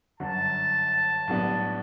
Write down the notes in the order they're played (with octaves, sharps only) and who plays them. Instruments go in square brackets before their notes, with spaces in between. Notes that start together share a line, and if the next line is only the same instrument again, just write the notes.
[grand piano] G1 F#2 D3 [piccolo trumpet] A5
[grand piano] B1 A2 G3 B3 D4